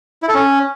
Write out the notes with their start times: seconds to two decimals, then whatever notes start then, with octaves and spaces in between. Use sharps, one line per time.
0.23 E4
0.28 A4
0.34 C#4